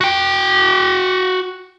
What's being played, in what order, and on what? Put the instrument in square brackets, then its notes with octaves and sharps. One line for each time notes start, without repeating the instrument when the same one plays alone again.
[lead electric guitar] F#4 G5